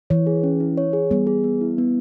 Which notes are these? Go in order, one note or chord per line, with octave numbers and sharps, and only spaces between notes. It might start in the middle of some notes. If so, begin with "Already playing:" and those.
E3 C#5
G#4
C#4
E4
C#5
G#4
G3 B3
G#4
B3
E4
B3